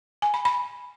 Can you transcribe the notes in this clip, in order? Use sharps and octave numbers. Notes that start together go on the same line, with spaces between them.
G#5
B5
B5